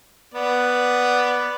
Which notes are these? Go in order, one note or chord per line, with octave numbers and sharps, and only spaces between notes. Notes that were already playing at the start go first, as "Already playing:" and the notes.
B3 D5